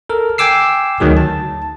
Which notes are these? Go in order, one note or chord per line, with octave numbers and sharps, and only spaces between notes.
A4 A#4
G5 G#5 D6 E6 C7
D2 D#3 F#3 G#4
A5